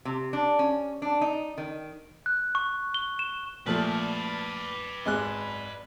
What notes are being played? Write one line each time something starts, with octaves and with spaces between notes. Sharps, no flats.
C3
D4
C#4
D4
D#4
D#3
F#6
C#6
G7
E7
A#2 F3 A3 B4 D5
G#1 G#3 F#6